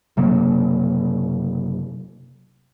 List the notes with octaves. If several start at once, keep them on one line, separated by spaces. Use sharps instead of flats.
F#1 C3 F#3 A#3